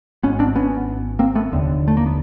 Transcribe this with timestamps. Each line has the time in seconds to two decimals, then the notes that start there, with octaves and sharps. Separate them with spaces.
0.23 G#1 G#2 B3 C#4
0.39 C4 D4
0.56 B3 C#4
1.19 A#3 C4
1.35 A3 B3
1.52 F1 D#2 D3
1.88 A3
1.97 A#3
2.06 B3